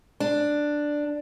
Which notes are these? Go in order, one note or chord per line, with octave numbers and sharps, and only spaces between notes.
D4